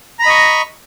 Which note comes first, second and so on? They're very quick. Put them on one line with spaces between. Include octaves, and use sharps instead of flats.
A#5 B5 D#5 C#6